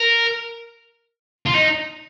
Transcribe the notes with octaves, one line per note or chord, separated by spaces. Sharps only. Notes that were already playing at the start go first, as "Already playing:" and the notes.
Already playing: A#4
F4
D#4